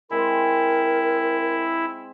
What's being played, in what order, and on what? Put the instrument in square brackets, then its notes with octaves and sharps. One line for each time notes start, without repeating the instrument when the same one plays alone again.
[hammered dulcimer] G#3 C4 [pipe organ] E4 [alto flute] A#4